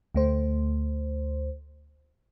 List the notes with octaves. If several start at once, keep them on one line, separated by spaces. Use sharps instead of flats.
D2 A3 C5